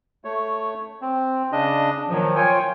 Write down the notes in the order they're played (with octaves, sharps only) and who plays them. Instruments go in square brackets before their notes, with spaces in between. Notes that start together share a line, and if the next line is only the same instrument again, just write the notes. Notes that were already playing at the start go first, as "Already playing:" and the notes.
[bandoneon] A3 C#5
C4
C#3 D4 D#5
[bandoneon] A#2 [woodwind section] D#3 F3 F#3
[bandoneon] F4 G5 [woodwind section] C#5 G#5